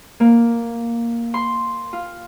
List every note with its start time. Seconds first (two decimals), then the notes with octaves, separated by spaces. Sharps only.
0.20 A#3
1.34 C6
1.93 F4